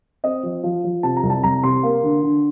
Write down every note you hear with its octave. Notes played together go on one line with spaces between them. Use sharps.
C4 D#5
F3
F3
F3
C3 A5
A#5
C2
A5
C2 A#5
C3 C6
A#3
D3
D3